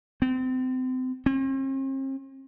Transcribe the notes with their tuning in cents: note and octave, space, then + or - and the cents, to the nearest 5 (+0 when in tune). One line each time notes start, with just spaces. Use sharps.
C4 -35
C4 +45